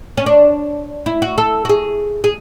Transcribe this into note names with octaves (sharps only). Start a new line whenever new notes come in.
C#4
D4
E4
F#4
A4
F#4
G#4
G#4